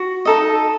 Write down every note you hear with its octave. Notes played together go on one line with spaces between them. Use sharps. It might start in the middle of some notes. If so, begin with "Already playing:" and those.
Already playing: F#4
D#4 A4 D#5